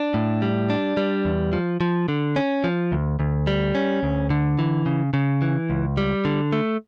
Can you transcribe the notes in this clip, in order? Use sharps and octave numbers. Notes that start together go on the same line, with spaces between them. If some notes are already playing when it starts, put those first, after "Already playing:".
Already playing: D4
A2
G3
D4
G3
E2
F3
F3
D3
C#4
F3
D2
D2
G3
C#4
D2
D3
E3
C#3
C#3
E3
C#2
G3
D3
A3